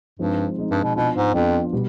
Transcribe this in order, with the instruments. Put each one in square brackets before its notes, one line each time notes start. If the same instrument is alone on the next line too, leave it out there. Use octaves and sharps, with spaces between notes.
[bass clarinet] G2 [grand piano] F3 G#3 C4 D#4
[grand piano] F3 G#3 C4 D#4
[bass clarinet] G2
B2
[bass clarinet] B2 [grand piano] F3 B3 D4 F4
[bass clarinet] G#2
[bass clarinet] F2 [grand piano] F3 B3 D4 F4
[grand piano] B2 G3